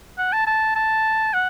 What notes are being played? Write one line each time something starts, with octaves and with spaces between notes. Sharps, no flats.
F#5
A5
A5
A5
F#5